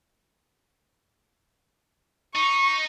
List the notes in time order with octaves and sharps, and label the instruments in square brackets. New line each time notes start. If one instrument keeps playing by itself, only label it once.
[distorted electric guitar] D#4 [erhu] C#6